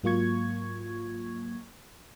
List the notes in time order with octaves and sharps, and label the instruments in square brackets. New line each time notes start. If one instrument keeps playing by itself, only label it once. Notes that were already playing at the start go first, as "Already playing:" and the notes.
[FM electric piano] G#2 F#3 A#3 F4 C#6 G#6